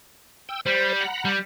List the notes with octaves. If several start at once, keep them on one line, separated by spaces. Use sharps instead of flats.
G5 E6
G3 C5
F#5 A#5 B5
G3